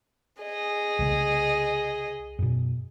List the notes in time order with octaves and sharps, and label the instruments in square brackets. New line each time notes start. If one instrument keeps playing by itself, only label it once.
[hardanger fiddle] G#4 D#5
[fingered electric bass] C2 C#3 A3
F#2 B2